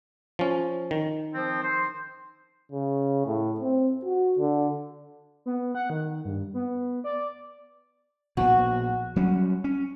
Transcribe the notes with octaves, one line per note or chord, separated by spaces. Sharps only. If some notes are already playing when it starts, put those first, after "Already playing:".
F3 C#4
D#3
F3 C4
C5
C#3
A2
C4
F#4
D3
B3
F#5
D#3
G2
B3
D5
A#1 B2 F#4
F#3 G3 C#4
C#4